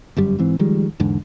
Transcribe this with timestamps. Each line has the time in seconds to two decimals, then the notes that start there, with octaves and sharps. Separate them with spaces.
0.17 G1 F#2 G3
0.39 G#2 E3 C4
0.59 D#3 F3 G3 G#3
1.00 E2 G#2 D3